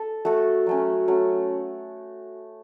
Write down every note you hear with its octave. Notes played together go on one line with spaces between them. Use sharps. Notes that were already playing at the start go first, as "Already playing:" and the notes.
Already playing: A4
A3 F#4 A4
F#3 A3 C#4
F#3 A3 C#4